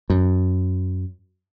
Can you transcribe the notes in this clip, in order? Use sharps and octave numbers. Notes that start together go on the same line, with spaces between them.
F#2